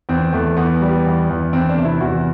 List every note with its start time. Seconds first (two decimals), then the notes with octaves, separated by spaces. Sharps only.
0.09 E2 C4
0.33 E2 A3
0.57 E2 B3
0.81 G3
1.06 E2
1.29 E2
1.53 E2 C4
1.69 D4
1.78 C3
1.85 E4
2.01 E2 F#4